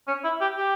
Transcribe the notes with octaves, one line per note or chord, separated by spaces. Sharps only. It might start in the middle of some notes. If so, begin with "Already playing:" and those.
C#4
E4
G4
G4